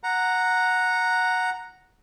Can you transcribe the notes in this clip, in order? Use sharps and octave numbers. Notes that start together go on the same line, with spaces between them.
F#5 A#5